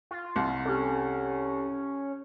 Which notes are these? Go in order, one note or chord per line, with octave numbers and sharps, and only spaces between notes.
F4
C2
C#4 G4 A4